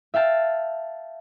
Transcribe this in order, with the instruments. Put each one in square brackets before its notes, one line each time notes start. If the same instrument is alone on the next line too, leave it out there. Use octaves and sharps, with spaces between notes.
[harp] E5 F5 G5 A5